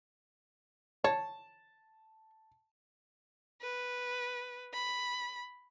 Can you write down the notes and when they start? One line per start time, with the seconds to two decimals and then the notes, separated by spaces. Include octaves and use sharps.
1.04 C#5 A5
3.62 B4
4.73 B5